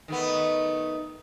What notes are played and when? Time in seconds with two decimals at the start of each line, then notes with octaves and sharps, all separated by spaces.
0.08 D#3 A3 B3